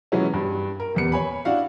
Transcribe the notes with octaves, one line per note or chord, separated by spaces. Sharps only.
B2 E3 F#3 G#3 B3 C#4
G2
A#4
D#1 E2 C#7
C#5 G#5 B5
D4 E4 F#4 F5